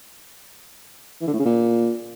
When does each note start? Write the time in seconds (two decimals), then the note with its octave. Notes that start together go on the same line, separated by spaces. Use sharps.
1.21 E3
1.27 D3
1.33 A2
1.39 C#3
1.45 A#2